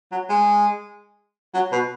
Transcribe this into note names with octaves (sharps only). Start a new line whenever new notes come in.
F#3
G#3
F#3
B2